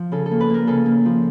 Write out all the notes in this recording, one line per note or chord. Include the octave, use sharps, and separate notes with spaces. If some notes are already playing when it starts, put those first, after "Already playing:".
Already playing: F3
C#3 A4
A4
A#3
B4
A#3 A#4
C#3 A4
A#3
F3